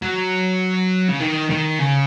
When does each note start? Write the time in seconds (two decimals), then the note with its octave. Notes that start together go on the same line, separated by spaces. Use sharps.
0.02 F#3
1.09 C#3
1.20 D#3
1.50 D#3
1.80 C#3